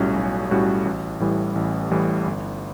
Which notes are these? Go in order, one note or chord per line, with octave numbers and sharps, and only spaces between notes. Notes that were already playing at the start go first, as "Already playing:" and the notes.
Already playing: B1 A2 G3 C#4 F#4
B1
A2 G3 C#4 F#4
A1
A2 E3 G3
A1
A2 E3 G3
G1